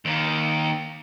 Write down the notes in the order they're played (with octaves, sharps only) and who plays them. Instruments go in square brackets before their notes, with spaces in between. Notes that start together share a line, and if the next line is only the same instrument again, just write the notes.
[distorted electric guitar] D#2 D#3